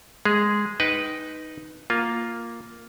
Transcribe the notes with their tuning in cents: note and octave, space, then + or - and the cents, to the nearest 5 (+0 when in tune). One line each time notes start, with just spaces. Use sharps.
G#3 +0 G#4 -5
D#4 +0 B4 +0 G5 -25
A#3 +0 F4 +0